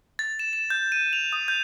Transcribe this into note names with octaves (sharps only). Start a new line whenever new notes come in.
A6
E7
E7
G6
D#7
F7
D#6
G6